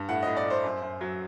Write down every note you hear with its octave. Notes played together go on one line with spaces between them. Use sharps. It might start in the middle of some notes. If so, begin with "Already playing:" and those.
Already playing: G2
A2 F#5
A2 D#5
D5
A2 C5
F#2
F#2
F#3